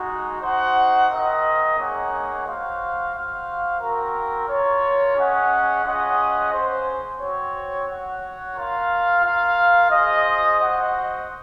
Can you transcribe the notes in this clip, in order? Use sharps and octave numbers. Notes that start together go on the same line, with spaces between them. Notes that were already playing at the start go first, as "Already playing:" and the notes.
Already playing: G#3 D#4 F#4
D#4 F#4 C5 F#5
C4 F4 A#4 D#5
A#3 D#4 G#4 C#5 F#5
F#4 C5 F5
F#4 C5 F5
C4 F#4 A#4
F4 A#4 C#5
C#4 G#4 D#5 F#5
C#4 F4 G#4 D#5 F#5
C#4 G#4 C5
C4 F#4 C#5
F#4 C#5 F#5
F4 A#4 F5
F4 A#4 F5
F4 G#4 C5 D#5
F#4 C5 D#5 F#5